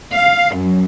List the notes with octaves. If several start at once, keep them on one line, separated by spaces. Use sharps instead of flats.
F5
F#2